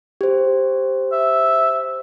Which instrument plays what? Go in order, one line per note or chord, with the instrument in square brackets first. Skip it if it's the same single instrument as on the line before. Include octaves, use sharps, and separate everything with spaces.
[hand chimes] G4 C5
[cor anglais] E5